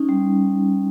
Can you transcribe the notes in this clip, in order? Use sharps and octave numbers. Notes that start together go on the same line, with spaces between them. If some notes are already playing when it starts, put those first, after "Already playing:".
Already playing: C#4 D#4
G3